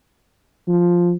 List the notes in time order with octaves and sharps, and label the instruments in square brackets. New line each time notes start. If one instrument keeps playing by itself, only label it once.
[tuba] F3